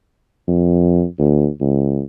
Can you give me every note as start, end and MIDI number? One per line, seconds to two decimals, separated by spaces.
0.48 1.04 41
1.19 1.48 38
1.61 2.01 37